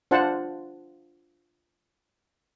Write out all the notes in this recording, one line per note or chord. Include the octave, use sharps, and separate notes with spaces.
D4 F4 C5 F#5 A5